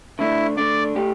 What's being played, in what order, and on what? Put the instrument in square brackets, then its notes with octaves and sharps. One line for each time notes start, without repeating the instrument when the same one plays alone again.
[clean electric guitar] D3 A3 D4 [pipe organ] E4
[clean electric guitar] D3 A3 D4 [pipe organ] D5
[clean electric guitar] A2 A3 G4